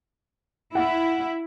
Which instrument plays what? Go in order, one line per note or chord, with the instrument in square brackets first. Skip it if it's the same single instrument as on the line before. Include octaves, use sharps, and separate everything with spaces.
[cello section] E4 [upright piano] F#5